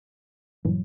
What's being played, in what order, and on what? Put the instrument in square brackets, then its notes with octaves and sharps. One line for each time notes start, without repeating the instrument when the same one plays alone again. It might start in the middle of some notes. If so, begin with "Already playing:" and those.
[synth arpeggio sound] G2 A#2 E3 [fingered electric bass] F#3